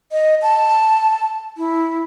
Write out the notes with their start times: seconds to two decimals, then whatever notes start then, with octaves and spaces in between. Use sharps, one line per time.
0.12 D#5
0.42 A5
1.57 E4